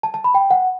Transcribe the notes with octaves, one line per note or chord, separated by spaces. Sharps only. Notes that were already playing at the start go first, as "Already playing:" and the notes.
A5
A5
B5
G5
F#5